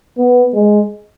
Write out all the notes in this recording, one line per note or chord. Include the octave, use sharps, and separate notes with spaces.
B3
G#3